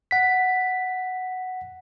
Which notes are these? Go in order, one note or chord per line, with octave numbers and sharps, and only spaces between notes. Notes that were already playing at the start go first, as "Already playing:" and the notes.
F#5 B6